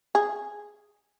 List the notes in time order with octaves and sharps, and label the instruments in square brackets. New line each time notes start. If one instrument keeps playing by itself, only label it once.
[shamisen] G#4